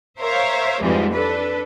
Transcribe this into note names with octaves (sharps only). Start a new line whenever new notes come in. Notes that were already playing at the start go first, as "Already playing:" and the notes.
A#4 C5 C#5 E5 F5
F2 G#2 E3 F3 G3 G#3
D4 A4 B4